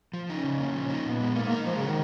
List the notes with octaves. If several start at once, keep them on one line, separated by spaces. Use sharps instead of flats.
F3
C#4 D#4
C#3
A#3
F3
D#4
A#2 B3
G#3
A#3 D#4
A#3
A#4
F3 G#3
C#3
D#3 F#4